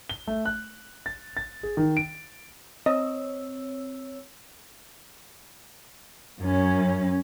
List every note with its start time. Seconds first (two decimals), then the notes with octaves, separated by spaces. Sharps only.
0.10 G7
0.27 A3
0.45 F#6
1.06 A6
1.37 A6
1.63 G#4
1.77 D#3
1.97 D7
2.86 C4 C#5 D#5 E6
6.39 F#2 C#4